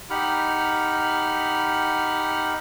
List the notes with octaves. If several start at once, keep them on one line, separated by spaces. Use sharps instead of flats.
D#4 G4 F#5 B5 F6